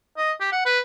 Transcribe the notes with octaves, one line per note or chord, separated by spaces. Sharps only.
D#5
G4
F#5
B4